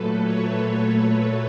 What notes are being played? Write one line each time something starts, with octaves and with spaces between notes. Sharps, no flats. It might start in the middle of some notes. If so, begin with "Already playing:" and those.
Already playing: A#2 F#3 A3 A4 B4
B4 C#5